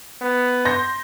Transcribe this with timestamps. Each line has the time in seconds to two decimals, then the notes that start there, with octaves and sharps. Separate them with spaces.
0.21 B3
0.65 C6 G6 A#6